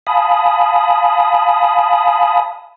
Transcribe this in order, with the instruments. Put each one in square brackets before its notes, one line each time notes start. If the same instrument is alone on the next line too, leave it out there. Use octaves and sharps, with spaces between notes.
[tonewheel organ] F5 G#5 A5 B5 D#6